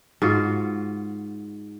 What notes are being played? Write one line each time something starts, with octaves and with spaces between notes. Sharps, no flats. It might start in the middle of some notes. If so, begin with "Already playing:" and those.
G#2 F4 F#4